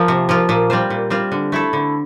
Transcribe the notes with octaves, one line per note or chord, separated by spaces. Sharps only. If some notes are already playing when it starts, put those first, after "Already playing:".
Already playing: F3 A#3 F4
C3
F3 A#3 F4
A#2
G3 C4 F4 C5
A#2
G3 C4 F4 C5
D3
A3 E4 A4
D3